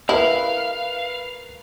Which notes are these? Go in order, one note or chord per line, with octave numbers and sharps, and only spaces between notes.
E4 A#4 B4 F5